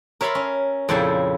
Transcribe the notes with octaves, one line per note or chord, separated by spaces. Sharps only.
A#4 C#5 E5 A5 B5 C6
C#4
F2 A#2 C#3 E4 G5 A5